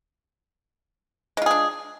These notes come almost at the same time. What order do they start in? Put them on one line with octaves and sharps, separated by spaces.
G#3 F4 G#4 D4